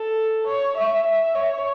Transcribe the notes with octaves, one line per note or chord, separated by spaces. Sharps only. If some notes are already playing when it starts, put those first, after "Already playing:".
Already playing: A4
C#5
E5
E5
C#5